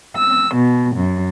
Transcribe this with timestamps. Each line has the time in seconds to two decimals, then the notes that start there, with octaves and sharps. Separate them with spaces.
0.17 E6
0.54 B2
0.96 F#2